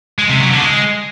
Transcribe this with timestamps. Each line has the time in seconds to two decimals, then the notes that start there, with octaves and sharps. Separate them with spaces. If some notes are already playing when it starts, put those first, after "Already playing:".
0.19 G#3
0.29 C3
0.40 F#3
0.51 D3
0.61 G#3